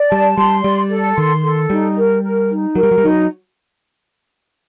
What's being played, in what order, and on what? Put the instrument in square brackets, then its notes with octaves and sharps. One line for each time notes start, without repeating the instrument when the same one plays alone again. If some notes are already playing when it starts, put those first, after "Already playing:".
Already playing: [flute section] D5
[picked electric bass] G3 [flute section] A5
[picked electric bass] G3 [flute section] C6
[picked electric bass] G3 [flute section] D5
[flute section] A4
[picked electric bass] D#3 [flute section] C6
[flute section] A4
[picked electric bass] G3 [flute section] D#4
[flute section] A#4
A#4
D#4
[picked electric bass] F#3 [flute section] A#4
[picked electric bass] G3
F#3
G3
[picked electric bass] F#3 [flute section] D#4